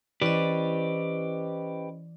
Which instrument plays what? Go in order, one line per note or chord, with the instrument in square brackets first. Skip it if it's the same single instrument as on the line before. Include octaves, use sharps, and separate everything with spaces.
[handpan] E3 D5 [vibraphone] C#4 C5 D#5 [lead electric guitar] G4 B4